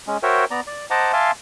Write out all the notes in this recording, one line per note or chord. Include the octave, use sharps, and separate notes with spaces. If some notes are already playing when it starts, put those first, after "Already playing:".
G#3 C#4
F#4 A#4 C5 C#5 E5 G5
B3 D5 A#5
D5
C5 D#5 F#5 A5 A#5 D6
E5 F5 G#5 A5 C6 D6